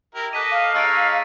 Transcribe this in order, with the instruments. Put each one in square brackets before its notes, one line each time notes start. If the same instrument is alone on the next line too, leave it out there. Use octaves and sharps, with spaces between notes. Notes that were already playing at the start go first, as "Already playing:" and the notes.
[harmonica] E4 G4 A#4
[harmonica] A4 D#5 D6 [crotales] F#6 B6 D#7
[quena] F5
[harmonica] G#3 D#4 C#5 [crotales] E6 A6 D7